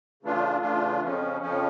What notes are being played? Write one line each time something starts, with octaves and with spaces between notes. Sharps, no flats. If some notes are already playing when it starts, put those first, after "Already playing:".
C#3 E3 A3 D4 F4
C#3 E3 A3 D4 F4
F2 C#3 F3 C#4
F2 C#3 F3 C#4